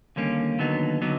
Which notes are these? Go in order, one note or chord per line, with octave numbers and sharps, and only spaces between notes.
D#2 D3 G3 A#3 C#4
D#2 D3 F#3 B3 D#4
D3 F#3 B3 D#4